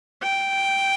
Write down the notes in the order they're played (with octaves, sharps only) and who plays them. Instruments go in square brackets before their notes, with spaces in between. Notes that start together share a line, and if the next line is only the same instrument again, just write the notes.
[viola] G5